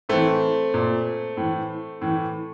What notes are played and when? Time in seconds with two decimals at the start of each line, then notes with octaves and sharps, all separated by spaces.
0.09 A2 E3 A3 C4
0.74 A#2
1.37 A2 E3
2.01 A2 E3